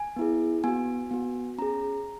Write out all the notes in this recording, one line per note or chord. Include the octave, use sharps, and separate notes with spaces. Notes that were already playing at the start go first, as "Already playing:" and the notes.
Already playing: G#5
B3 E4 G#4
B3 F#4 G#5
B3 F#4
C#4 G#4 A#5